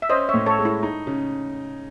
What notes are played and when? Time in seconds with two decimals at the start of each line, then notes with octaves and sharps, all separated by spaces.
0.02 E5
0.10 C#4 C5 D#5
0.29 A2 C#5 E5
0.46 A4 C#5
0.59 G#3
0.65 E4
0.83 D#4
1.07 C#3